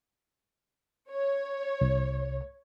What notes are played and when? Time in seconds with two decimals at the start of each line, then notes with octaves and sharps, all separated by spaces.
1.10 C#5
1.81 C2